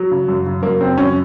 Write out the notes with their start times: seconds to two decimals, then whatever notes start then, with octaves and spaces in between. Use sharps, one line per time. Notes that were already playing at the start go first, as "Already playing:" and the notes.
Already playing: F#3
0.11 C#3
0.28 F#2
0.46 C#3
0.62 F#2 A#3
0.81 C#3 C4
0.98 F#2 C#4